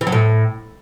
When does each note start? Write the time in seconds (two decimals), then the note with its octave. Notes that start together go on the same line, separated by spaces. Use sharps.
0.01 E3
0.07 F#3
0.12 A2